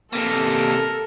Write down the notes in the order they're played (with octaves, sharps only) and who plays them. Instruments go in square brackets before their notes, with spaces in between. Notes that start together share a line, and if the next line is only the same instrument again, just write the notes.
[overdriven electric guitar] C3 A#3 [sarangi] A4 [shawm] A#4